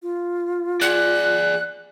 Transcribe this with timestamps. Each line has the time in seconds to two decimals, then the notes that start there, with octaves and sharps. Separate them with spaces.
0.02 F4
0.81 G#4 D5 F#6